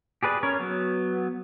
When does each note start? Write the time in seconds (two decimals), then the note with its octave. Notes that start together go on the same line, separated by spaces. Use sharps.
0.23 G4 G#4 B4 D5
0.43 C#4 A#4 C#5
0.60 F#3 B3